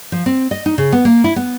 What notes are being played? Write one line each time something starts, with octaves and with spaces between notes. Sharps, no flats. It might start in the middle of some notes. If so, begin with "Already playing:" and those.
F3
C4
D#5
D#4
C#3
B3
A#3
E4
B3